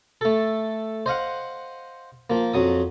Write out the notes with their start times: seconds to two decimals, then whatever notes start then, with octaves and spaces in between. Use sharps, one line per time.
0.21 A3 A4
1.06 C5 D#5 F5 F#5
2.30 F3 A#3
2.54 F2 F#3 D#6